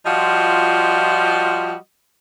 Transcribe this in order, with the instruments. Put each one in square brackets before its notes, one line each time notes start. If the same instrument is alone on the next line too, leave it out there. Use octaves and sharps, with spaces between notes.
[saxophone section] F3 G3 F4 F#4 D#5